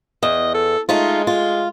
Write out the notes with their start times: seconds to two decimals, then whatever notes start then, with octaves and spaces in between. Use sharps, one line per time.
0.23 E2 D#5
0.54 A4
0.89 G#3 A3 D#4 F4
1.27 F4